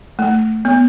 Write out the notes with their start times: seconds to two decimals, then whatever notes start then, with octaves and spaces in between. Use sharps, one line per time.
0.19 A3
0.65 B3